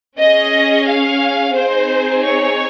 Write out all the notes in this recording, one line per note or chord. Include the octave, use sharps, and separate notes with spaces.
C#4 G#4 D#5
F5
C4 D#4 G#4 C5
C#5